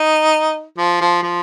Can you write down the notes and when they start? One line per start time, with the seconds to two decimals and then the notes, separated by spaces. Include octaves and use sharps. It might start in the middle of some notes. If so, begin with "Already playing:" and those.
Already playing: D#4
0.78 F3
1.01 F3
1.23 F3